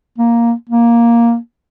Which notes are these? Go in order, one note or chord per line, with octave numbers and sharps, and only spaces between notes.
A#3
A#3